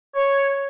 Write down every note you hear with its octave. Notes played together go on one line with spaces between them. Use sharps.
C#5